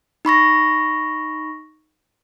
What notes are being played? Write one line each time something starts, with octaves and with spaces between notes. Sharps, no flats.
D#4 B5 C#6 A#6